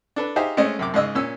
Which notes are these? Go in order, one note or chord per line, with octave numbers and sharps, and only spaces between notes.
D4 A4 B4
D#4 G4 G#4 C5 E5 F5
G#3 A3 C4 C#4 D#5
F#2 C3 D6
G#2 C#3 D#5 E6
A#2 C#4 E6